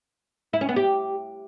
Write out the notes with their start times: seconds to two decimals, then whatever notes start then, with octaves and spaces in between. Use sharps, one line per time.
0.53 E4
0.61 C#4
0.69 B3
0.76 G4